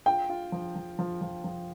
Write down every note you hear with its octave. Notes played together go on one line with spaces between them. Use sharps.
F4 G5
F4
F3
F3
F3
F3
F3